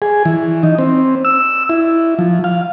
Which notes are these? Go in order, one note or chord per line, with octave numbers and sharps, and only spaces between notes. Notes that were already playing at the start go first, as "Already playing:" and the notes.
G#4
E3
D#4
C4
E6
E4
F3
F5